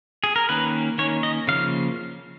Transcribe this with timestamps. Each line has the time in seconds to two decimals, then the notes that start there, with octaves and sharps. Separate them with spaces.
0.24 G#4
0.36 A#4
0.49 D#3 A#3 C#4 B4
0.98 D#3 A#3 C#4 C#5
1.23 D#5
1.47 C#3 F3 A#3 F5